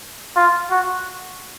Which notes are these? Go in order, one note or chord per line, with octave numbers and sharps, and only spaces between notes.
F4
F#4